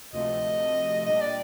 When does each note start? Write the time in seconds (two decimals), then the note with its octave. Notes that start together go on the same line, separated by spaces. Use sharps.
0.12 D2 C3 F3 A3 D#5
1.05 A#2 G3 D4 G4 D#5
1.21 D5